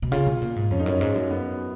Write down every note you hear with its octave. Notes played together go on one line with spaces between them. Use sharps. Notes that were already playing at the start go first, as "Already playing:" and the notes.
B2
C#3 F4
B2
A#2
G#2
F2 C#4
D#4
F#2 C#4
G#2
F#2
B3